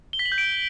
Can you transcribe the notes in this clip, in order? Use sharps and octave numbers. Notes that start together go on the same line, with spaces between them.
G7
B6
F#7
G6
D7